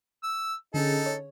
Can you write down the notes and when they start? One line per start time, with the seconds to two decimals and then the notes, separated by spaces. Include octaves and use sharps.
0.23 E6
0.74 D3 C#4 D#4 G#4 A4
1.06 C#5